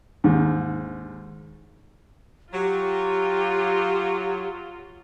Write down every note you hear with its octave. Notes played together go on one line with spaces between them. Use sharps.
D#2 G#2
F#3 F4 G4